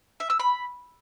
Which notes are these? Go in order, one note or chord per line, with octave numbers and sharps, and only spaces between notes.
E5
E6
B5